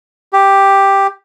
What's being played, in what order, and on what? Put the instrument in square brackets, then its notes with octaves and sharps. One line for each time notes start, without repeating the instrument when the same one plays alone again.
[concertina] G4